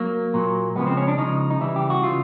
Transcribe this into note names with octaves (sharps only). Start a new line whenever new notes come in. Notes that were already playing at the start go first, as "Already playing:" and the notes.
Already playing: F#3 A#3
A#2 F#3
C#3 F3 G#3 B3
C4
C#4
D4
C#3 F3 G#3 D#4
D#4
C#3 E3 G3 E4
G4
F#4
C#3 E3 G3 F4